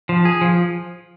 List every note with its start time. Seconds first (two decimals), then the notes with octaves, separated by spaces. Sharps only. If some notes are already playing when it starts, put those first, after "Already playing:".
0.09 F3
0.25 G#4
0.41 F3